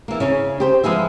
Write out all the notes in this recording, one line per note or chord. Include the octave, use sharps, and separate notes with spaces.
E3 A#3
C#3 C#4
G4 C5
F3 G#3 B3 G#4 E5